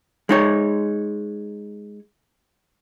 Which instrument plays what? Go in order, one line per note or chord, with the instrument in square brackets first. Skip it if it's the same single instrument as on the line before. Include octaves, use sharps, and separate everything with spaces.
[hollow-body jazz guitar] G#3 D#4 C#5